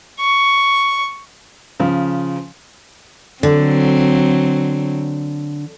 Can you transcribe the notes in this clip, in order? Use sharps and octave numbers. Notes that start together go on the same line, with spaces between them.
C#6
C#3 F3
D3 F#3 C4